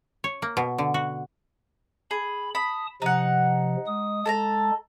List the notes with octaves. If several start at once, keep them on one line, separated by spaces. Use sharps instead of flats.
C#5
A#3
B2
D3
F#4
G#4 B5
A5 B5 D#6
C3 F3 D#4 F#5
G#3 D#6
G#3 A4 A5 A#5